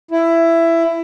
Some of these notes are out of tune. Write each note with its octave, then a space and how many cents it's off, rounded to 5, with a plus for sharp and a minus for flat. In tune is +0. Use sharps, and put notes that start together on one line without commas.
E4 +15